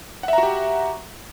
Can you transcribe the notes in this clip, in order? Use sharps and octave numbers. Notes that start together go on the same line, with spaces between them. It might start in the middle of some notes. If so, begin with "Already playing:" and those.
F#4 G4 E5 F#5 A#5